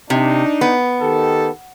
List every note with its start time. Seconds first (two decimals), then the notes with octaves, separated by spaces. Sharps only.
0.10 C3 D4 D#4
0.61 B3
1.01 D#3 G4 A4